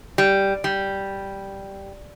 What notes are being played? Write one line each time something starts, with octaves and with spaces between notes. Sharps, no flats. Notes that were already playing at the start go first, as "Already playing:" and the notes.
G3
G3